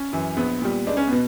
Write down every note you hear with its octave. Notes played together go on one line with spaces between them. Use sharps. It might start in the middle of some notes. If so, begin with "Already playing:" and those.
Already playing: C#4
F#2 E3
A#1 B3
A#2 G3
C#2 D4
C#4
B3
B2